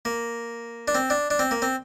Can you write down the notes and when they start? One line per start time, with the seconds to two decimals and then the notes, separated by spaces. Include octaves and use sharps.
0.05 A#3
0.88 D4
0.95 C4
1.10 D4
1.30 D4
1.39 C4
1.51 A#3
1.62 C4